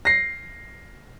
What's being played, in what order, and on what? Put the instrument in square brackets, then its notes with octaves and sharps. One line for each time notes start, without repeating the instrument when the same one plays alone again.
[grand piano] A#6 C7